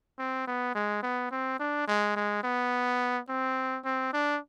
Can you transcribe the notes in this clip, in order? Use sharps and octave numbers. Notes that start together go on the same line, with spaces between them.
C4
B3
G#3
B3
C4
D4
G#3
G#3
B3
C4
C4
D4